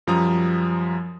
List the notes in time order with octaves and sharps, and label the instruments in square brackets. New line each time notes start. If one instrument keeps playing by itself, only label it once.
[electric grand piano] F#2 F3 G3 A#5 D#6